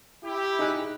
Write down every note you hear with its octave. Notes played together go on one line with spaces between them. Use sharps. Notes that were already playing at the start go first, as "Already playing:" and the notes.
E4 G4
D#4 G#4 F#6